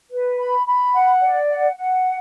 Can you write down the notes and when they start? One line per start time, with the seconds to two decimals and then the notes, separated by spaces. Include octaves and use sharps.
0.10 B4
0.38 B5
0.66 B5
0.94 F#5
1.22 D5
1.50 F#5
1.78 F#5